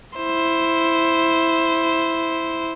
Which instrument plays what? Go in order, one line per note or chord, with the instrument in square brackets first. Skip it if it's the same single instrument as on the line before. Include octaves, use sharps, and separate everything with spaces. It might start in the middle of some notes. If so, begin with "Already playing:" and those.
[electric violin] E4 C5